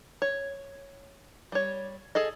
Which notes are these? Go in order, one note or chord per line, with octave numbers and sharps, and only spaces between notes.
C#5
G3 C#5
G#4 A4 D#5